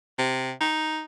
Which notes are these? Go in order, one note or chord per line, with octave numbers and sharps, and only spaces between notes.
C3
D#4